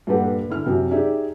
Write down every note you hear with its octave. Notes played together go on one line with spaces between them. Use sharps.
G2 A#2 G4 A4 B4 F#5
D3 E4 F6
F#2 C3
D#4 G4 G#4 D5 E5